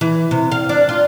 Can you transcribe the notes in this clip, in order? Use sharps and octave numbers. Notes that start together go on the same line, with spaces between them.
E3
C3
F5
D4
F4